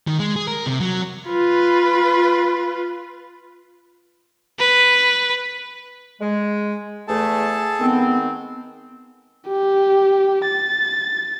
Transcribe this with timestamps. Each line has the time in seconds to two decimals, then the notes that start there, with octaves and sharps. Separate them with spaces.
0.07 D#3
0.19 G#3
0.36 G#4
0.48 A#4
0.66 C3
0.80 F#3
1.27 F4 B4
4.60 B4
6.20 G#3
7.08 E2 A3 G#4 A4 A5
7.80 D#3 G#3 B3 C4
9.48 G4
10.46 A6